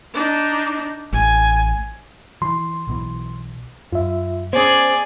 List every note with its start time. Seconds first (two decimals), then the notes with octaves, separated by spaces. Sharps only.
0.14 D4 D#4
1.13 A1 G#5
2.42 E3 F3 C6
2.87 B1 B2 E3
3.92 F#2 F4 E5
4.53 B3 C#4 G#4 C5 D5